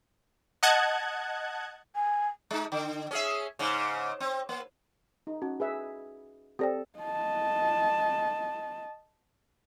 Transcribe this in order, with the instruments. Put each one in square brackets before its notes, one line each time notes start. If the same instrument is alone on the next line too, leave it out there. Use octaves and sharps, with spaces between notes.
[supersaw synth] D#5 F#5 A5 F#6 G#6
[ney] G#5
[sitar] G#3 D#4
D3
C#4 G#4 E5
G#2 C#3
C4
A#3
[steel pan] D#4
[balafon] C#4 [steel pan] F#4
[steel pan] G#4 B4 E5
[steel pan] C4 A4 [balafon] G4 D5 G5
[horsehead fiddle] D#5 A5